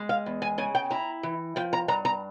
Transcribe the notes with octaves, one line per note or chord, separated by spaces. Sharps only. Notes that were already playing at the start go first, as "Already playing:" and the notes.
Already playing: G#3
F5
E2
G#5
C#3 G#5
G5
E4 A#5
E3
F3 G5
A#5
G2 A#5
A#5